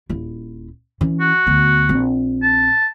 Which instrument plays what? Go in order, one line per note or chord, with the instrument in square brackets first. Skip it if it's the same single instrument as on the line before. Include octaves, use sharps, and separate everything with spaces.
[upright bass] D#1 E4
E3 C#4
[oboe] F#4
[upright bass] D2 B3
A#1 C4
[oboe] A5